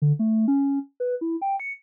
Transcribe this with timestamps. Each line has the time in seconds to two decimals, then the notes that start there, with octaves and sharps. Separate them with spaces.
0.02 D3
0.19 A3
0.48 C#4
1.00 B4
1.21 E4
1.42 G5
1.60 C#7